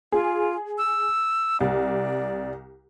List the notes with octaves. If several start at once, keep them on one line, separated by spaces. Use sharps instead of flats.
F4 G#4
E6
C2 D5